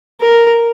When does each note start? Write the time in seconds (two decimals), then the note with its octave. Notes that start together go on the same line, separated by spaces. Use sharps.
0.21 A#4